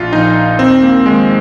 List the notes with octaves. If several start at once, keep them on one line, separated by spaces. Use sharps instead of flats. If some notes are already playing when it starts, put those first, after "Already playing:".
Already playing: A#1 F4
A#2 F3 D#4
D#2 C4
A#3
D#3 G#3